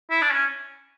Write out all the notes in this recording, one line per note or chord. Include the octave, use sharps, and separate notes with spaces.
E4
D4
C#4